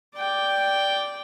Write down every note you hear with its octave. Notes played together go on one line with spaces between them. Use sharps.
D5 G5